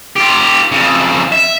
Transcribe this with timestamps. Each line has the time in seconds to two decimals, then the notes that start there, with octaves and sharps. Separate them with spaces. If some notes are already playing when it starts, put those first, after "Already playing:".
0.16 F4 G4
0.72 F2 C#3
1.32 E5